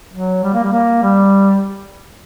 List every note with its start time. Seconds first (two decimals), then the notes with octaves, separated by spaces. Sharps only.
0.13 F#3
0.43 G3
0.54 A#3
0.64 G3
0.73 A#3
1.02 G3